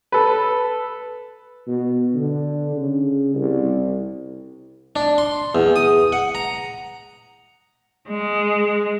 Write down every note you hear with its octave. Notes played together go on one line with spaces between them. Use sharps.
A4 B4
B2
D3
C#3
C2
D4
C6
E2
D#6
F#5
A#5
G#3